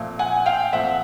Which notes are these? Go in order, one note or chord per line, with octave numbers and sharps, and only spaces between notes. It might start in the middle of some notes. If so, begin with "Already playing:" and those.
Already playing: A#2 F3 A3 C4
F#5 G#5
F5 G5
A#2 F3 A3 C4 E5 F#5